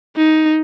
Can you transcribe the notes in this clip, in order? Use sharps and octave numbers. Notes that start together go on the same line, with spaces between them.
D#4